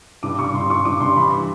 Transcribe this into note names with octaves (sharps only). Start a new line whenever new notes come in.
G2 D6
G2 C#6
G2 C6
G2 C#6
G2 D6
G2 C6
E3 B5